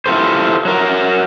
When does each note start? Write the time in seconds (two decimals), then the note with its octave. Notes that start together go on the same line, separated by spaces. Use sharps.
0.06 E4 F4 G4 A4 A#4 C5
0.65 F#3 A#4